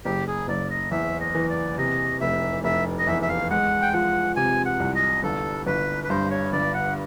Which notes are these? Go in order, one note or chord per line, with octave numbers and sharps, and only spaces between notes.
F#1 G4
G#4
F#1 D5
D#5
E2 E5
D#5
E3
D5
C3 D#5
F1 E5
F1 E5
D#5
E2 E5
E5
F5
G#3 F#5
G5
F3 F#5
C3 G#5
F#5
C2
D#5
G1 A4
G1 B4
B4
G2 C5
C#5
G1 D5
F#5